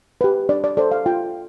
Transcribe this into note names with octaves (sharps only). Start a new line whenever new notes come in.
G4 B4
D4 D5
D5
A4 C5 D5
F5
F4 G5